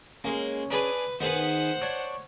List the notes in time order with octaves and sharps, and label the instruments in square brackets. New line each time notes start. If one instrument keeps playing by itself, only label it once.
[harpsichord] G#3 A#3 [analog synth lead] C#4
[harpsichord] D4 G#4 [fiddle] B4
[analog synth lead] D#3 [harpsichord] B3 G#4 B4 [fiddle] C5 F#5
[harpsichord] D4 [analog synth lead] C#5